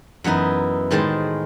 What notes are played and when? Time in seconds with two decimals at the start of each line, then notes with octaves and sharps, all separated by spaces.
0.24 F#2 E3 B3 D#4 E4
0.91 A2 D#3 G#3 C5 A5